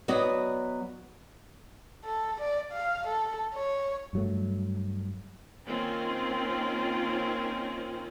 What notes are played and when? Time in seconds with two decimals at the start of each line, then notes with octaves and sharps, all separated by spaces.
0.08 F#3 B3 F#4 D5 D#5
2.04 A4
2.41 D5
2.72 F5
3.08 A4
3.54 C#5
4.13 G2 F#3 A3
5.66 D#3 A#3 C4 C#4 F4